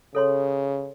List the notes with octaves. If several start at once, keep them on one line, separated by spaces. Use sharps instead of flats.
C#3 A4 C#5 C6